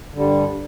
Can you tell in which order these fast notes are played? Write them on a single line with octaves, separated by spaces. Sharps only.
D3 G3 G2